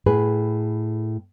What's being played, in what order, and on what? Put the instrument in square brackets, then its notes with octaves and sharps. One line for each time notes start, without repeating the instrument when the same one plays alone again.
[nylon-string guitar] A2 G#4 B4